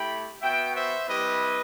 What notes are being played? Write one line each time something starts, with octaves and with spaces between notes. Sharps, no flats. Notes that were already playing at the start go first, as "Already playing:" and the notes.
Already playing: A3 E4 G4 G5 B5
B3 F#4 E5 G5
C5 E5
G3 C4 E4 G4 B4 D#5